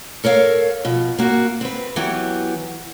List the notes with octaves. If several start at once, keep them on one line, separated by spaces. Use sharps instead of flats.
A4 A#4 C#5 F5
B2 F3
A#3 F#4
C4 B4
E3 F#3 B3 G4